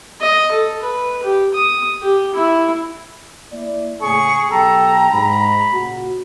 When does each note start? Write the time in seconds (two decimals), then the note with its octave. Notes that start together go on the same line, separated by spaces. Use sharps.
0.21 D#5
0.52 A4
0.82 B4
1.23 G4
1.55 D#6
2.02 G4
2.35 E4
3.52 A#3 E4 D5
4.01 A2 C#3 G#4 C#6
4.50 B1 G4 A4 G5 A#5
5.13 G#2 B5
5.72 A#2 C#3 F#4